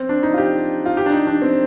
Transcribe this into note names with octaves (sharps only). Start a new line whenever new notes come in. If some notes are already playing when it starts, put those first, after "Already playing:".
Already playing: C4
D4
D#4
F4
G4
F4
G4
D4
D#4
D4
C4